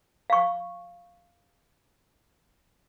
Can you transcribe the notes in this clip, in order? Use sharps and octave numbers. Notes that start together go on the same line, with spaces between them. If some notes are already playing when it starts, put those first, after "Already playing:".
F5 C#6